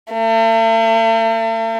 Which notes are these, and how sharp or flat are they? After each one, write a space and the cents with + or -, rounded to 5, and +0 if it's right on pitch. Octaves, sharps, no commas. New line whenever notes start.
A3 +45